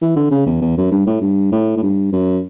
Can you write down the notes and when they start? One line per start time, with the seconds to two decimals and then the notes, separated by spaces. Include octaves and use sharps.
0.02 E3
0.16 D3
0.31 C#3
0.47 E2
0.62 E2
0.77 F#2
0.92 G2
1.07 A2
1.21 G2
1.52 A2
1.77 A2
1.83 G2
2.12 F#2